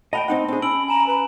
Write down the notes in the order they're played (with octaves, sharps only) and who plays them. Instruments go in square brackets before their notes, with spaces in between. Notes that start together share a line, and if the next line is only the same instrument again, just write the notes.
[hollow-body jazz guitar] D#5 F#5 G5 [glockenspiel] A5 B5 G7
[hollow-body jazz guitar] C4 D#4 F#5 [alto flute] D#5
[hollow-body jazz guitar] C4 G#4 [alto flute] D4
[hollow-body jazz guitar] C#4 [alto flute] B5 [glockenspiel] E6 D7 F#7
[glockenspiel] G#5 E7 F#7 [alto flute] A#5
[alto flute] B4 [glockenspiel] A#5